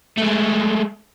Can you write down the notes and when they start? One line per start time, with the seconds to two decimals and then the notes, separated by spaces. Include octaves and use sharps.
0.18 G#3 A3